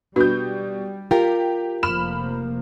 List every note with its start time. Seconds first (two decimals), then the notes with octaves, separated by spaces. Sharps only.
0.16 B2 G3 D4 F#4 B4 G6
1.11 F4 G4 A#4
1.83 F1 F3 A#3 B5 F6 E7